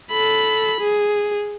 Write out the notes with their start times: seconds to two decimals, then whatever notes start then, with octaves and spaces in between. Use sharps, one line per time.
0.12 A4 B5
0.81 G#4